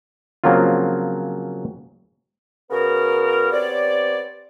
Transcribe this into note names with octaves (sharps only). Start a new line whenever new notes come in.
C#3 F3 F#3 A#3 C4 F4
C#3 B3 F#4 G#4 A#4
B3 C4 G4 C#5 D5